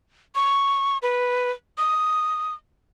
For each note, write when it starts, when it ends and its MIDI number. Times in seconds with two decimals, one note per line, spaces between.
0.35 0.98 85
1.02 1.51 71
1.78 2.54 87